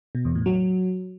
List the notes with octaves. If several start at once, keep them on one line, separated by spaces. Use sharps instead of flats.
B2
E2
A2
F#3